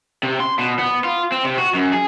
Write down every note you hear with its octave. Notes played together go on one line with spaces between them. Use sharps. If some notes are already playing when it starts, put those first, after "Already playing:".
C3
C6
B2
B3
F4
C4
C3
F#4
F#2
G#4